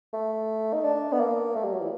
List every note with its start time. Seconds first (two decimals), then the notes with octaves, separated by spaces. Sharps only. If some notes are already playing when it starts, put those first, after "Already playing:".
0.14 A3
0.73 D#4
0.84 D4
1.12 B3
1.20 A#3
1.56 A3
1.64 G3
1.72 F#3
1.81 E3